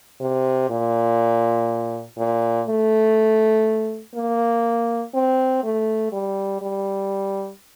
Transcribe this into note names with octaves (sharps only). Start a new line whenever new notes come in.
C3
A#2
A#2
A3
A#3
C4
A3
G3
G3